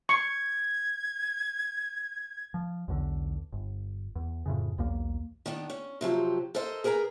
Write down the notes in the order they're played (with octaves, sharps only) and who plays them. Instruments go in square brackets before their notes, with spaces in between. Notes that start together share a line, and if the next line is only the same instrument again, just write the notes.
[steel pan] C#6 [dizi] G#6
[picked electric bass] F3
B1 E2 D3
G1
E2
F2 A2 C#3
B1 E2 A#3
[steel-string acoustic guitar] D#3 B3 D4
C#4
C3 F3 F#3 G4
A4 A#4 C5 D#5
G#4 A#4 B4 G#5 A#5